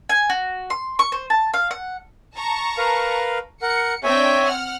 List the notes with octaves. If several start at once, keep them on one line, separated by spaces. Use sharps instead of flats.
G#5
F#4
C6
C#6
C5
A5
F5
F#5
A5 A#5 C#6
A#4 B4 F5
A#4 F#5 C#7
C4 D4 C#5 E5 G5 G#5
F#5 F6